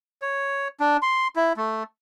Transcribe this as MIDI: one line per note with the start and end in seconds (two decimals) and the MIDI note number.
0.22 0.68 73
0.80 0.97 62
1.02 1.28 84
1.36 1.53 64
1.57 1.83 57